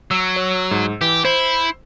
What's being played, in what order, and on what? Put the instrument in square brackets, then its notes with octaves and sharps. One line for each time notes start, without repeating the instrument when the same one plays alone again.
[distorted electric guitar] F#3 [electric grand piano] E6
[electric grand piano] C#5
G#2
[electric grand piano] E3 [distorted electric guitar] G4
[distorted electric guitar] E4 [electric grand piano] C5